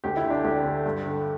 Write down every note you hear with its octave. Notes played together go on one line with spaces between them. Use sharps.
D2 G4
E4
D3
D4
D2 G4
D3
G2
D3